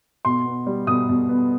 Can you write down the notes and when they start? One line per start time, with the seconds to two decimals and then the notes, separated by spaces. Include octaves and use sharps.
0.25 B2 C6
0.45 B3
0.66 G3
0.87 B2 D#6
1.09 B2
1.29 B3